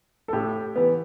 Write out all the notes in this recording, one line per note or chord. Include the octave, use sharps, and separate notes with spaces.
A4
A2 G4
E3 B3